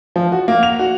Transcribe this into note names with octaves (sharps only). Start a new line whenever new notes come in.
F3
F#4
A#3
F7
F#4